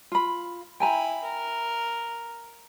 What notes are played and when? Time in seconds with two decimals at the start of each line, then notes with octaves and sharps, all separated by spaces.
0.12 F4 B5
0.80 E4 G5 G#5 A#5 B5
1.24 A#4